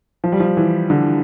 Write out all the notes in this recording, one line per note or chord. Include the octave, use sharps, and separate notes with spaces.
F3
G3
F3
E3
D3